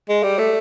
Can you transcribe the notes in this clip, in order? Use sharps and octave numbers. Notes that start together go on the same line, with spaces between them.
G#3
G3
A3